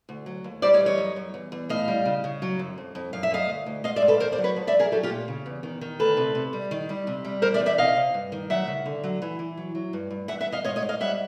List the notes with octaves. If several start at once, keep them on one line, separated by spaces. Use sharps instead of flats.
D2
F#3
D#2
G3 C5 D5
C#5 D#5
E3
C#5 D#5
F#2
F#2
E2
E2
A2 D#5 F5
G3
C#3
C#3
F#3
F#2
F2
F2
F#2 F5
E5
F#2 D#5 F5
D2
D2
G#2 D#5 F5
D5 E5
G#2
A4 B4
D#2 A#4 C5
C5 D5
F#3
B4 C#5
F3
D5 E5
F#2
G#4 A#4
F#3 G4 A4
F4 G4
A#2
C#3
E2
D#3
D#3
D2 A4 B4
C3
C3
G3
D#3
G3
C3
G3
E2 A#4 C5
D5 E5
E2
D5 E5
C3 D#5 F5
C3
G2
D#3
F#3 E5 F#5
C#3
D3
F#3
E3
E3
F#3
F#3
G2
G2
E2 E5 F#5
E5 F#5
E2
D#5 F5
G#2 C#5 D#5
C#5 D#5
G#2
D#5 F5
G3 E5 F#5